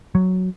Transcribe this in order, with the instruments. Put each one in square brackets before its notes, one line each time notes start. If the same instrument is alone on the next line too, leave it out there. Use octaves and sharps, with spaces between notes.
[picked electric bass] F#3